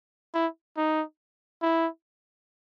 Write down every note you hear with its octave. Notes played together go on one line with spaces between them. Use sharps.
E4
D#4
E4